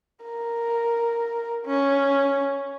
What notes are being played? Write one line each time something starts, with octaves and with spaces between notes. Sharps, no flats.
A#4
C#4